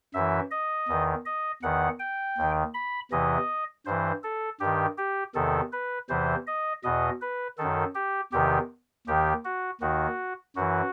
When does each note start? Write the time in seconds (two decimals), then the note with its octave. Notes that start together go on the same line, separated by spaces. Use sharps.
0.14 F#2 E3 E5
0.51 D#5
0.88 E2 D#3
1.26 D#5
1.63 E2 D#3 F#5
1.99 G5
2.38 D#2 D#3
2.74 B5
3.11 E2 C3 E3 D#5
3.86 G2 E3 C5
4.23 A4
4.60 G2 D#3 G4
4.98 G4
5.35 E2 C3 D#3 A4
5.73 B4
6.10 E2 C3 E3 C5
6.47 D#5
6.84 E2 B2 D#5
7.21 B4
7.58 F#2 D#3 A4
7.95 G4
8.32 E2 C3 D#3 G4
9.07 D#2 D#3 G4
9.45 F#4
9.81 D#2 D#3 F#4
10.56 F#2 E3 F#4